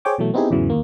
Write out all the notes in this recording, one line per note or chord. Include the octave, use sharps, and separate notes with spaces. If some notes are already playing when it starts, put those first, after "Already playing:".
G#4 C5 C#5 G5 D6
B2 E3 F#3 A3
B3 C4 D#4 E4 G4 G#4
E2 G#2 C#3 E3 F#3
D#2 A#3